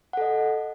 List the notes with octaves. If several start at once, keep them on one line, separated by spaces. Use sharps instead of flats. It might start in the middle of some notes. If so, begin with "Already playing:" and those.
A4 D#5 F#5